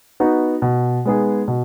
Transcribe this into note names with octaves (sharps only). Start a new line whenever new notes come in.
B3 D#4 F#4
B2
G#3 B3 D#4 G#4
B2